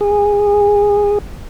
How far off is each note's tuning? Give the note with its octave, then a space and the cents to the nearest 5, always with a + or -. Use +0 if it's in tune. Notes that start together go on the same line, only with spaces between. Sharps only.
G#4 -20